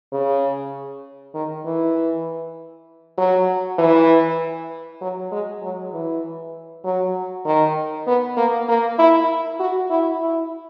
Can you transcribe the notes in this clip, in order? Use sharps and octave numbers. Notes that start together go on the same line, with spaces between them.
C#3
D#3
E3
F#3
E3
F#3
G#3
F#3
E3
F#3
D#3
B3
A#3
A#3
E4
F#4
E4
E4